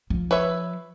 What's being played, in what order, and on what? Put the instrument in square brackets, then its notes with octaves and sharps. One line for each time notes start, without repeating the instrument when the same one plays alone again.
[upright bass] F3
[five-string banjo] B4 C#5 E5